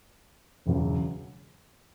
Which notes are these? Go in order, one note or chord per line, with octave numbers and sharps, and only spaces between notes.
E1 E2 C#3 F#3